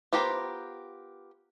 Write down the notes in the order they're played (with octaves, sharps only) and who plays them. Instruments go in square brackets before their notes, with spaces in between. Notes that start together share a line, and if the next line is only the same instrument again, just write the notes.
[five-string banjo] B3 F4 G4 A#4 C5